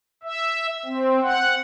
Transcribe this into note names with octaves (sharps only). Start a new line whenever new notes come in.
E5
C4
F#5